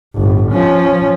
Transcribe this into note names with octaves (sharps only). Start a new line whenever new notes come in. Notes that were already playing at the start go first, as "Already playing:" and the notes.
G1 A2
F3 C#4